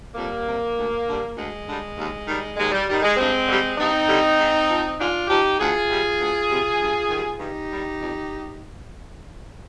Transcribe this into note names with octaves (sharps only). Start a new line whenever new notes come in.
F2 G3 A#3
C3 G3
D2
D3 G3
D2 G#3
D3 G3
D#2
D#3 G3
D#2 G#3
G3
D#3 G3
G#3
G2 G#3 C4
D3 G3
G2 C4 D#4
D3 G3
G#2
F3
G#2 D4 F4
F3 D#4 G4
D2 F4 G#4
C3 G3
D2
C3 G3
G2
D#3 G3
G2 D#4 G4
D#3 G3
F2